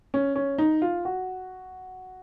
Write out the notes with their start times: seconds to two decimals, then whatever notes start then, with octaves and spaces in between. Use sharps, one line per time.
0.14 C#4
0.36 C#4
0.58 D#4
0.82 F4
1.05 F#4